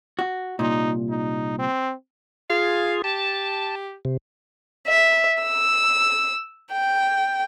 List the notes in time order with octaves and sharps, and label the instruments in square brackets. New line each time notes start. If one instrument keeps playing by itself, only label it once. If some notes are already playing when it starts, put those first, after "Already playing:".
[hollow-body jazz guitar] F#4
[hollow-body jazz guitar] C2 A#2 [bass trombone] D#4
[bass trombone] D#4
C4
[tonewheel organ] F4 G#4 [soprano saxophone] F5
[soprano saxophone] G4 [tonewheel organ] A5
[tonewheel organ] C3
[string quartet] E5
E6
G5